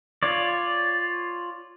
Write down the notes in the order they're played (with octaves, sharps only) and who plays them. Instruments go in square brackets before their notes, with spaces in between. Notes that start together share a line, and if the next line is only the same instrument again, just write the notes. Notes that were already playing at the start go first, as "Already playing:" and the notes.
[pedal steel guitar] F4 C#5 D5